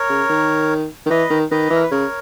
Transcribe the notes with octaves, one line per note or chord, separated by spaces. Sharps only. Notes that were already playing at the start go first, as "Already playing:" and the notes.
Already playing: A#4 C#5
C#3
D#3
D#3
E3 B4 D#5
D#3
D#3 B4 D#5
E3 A#4
B4
C#3 A#4 C#5